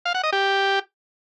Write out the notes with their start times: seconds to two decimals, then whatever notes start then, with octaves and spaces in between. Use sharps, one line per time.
0.05 F5
0.15 F#5
0.24 D#5
0.33 G4